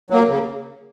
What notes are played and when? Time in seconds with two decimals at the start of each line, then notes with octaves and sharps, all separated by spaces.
0.10 F#3 A#3
0.29 C#3